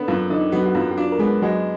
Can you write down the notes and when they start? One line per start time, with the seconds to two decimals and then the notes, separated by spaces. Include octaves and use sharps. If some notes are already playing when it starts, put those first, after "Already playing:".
Already playing: D3 B3
0.08 F#2 F4
0.30 D3 D#4 D#5
0.52 F#3 B3 F#4
0.66 F#4
0.75 F#2 F4
0.91 F#4
0.98 D4 F4
1.12 A#4
1.19 G#3 B3 G#4
1.42 F#3 G#3 F#4